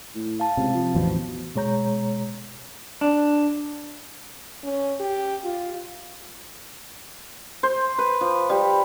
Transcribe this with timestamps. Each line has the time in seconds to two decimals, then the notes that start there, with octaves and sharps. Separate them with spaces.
0.15 A2
0.40 F5 A5
0.57 C#2 C3
0.74 F3
0.95 A1 E2 B2 F3
1.55 B2 G#3 C#5 A#5 G6
3.01 D4
4.64 C#4
5.00 G4
5.44 F4
7.63 C5
7.98 B4
8.21 F3
8.50 G3